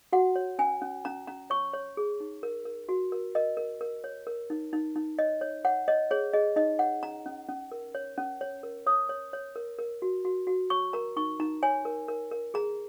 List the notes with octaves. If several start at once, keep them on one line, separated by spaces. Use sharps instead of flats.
F#4 F#5
C#5
C#4 G#5
C#4
C#4 A#5
C#4 A#5
C#5 C#6
C#5
G#4
D#4
A#4
A#4
F#4
A#4
A#4 D#5
A#4
A#4
C#5
A#4
D#4
D#4
D#4
C#5 D#5
C#5
C#5 F#5
C#5 D#5
G#4 C#5
G#4 D#5
D#4 D#5
C#5 F#5
C#4 A#5
C#4
C#4
A#4
C#5
C#4
C#5
A#4
C#5 D#6
C#5
C#5
A#4
A#4
F#4
F#4
F#4
C#5 C#6
A#4 A#5
D#4 C#6
D#4 A#5
C#5 G#5
A#4
A#4
A#4
G#4 A#5